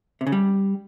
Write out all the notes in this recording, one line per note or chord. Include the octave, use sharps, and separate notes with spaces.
C3
C#3
G3